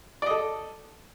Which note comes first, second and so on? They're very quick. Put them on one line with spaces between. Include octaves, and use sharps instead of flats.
D5 D#5 A4